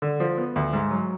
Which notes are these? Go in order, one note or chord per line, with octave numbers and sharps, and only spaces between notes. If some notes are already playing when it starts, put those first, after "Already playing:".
D3
F3
B3
D2
G#2
F#3